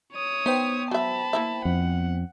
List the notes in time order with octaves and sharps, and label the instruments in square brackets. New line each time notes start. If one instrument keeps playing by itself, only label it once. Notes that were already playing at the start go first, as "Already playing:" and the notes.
[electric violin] C#5 D#6
[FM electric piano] B3 C5 G5 [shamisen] D#4
[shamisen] F#3 E5 [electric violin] A5 B5
[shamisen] A#3 E4 E5
[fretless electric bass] F2 [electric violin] F#5